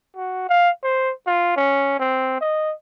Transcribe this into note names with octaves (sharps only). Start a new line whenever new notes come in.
F#4
F5
C5
F4
C#4
C4
D#5